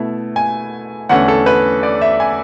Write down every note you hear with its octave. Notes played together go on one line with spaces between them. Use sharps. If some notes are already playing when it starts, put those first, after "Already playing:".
Already playing: B2 A3 E4
G#5
E2 D3 A3 C#4 F#5
A4
B4
D5
E5
G#5